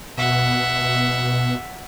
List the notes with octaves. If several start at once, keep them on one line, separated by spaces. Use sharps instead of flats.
B2 E5 F#5